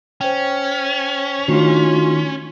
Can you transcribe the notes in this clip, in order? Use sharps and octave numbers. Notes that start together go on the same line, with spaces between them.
C#4 C5 G5
D#3 A3 D4 F4 F#4